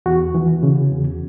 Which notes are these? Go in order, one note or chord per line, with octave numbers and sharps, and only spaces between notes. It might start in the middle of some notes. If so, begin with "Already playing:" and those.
E2 F#4
E3
C#3
E2